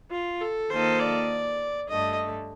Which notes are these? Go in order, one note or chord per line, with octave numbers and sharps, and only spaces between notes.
F4
A4
D#3 A#3 F4 A4 C5 D#5
D5
G2 D3 A3 D#5